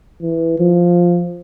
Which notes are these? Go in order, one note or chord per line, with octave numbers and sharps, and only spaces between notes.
E3
F3